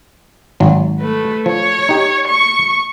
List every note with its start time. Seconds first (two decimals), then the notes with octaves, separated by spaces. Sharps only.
0.60 G#1 F#3
0.99 A3 B4
1.46 F3 C#5
1.89 D#4 G4
2.28 C#6